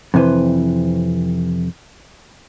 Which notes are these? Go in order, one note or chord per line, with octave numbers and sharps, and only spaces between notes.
F2 C3 E3 B4 C5